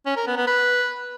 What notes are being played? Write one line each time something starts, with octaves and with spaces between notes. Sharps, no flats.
C#4
A#4
B3
B3
B4